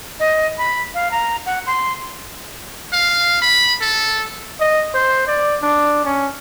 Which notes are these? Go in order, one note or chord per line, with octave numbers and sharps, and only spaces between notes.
D#5
B5
F5
A#5
F#5
C6
F5
B5
A4
D#5
C5
D5
D4
C#4